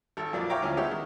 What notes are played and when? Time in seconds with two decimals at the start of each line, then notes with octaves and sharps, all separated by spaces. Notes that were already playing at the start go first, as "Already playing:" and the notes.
0.17 G#1 A4
0.33 F2 A#2 F#3 A#3 D5
0.50 C#5 E5 F5 G5 A#5 D6
0.62 D2 E3 F3 C#4 F6
0.77 G#3 B3 D#4 G4 C#5 E5
0.91 D#3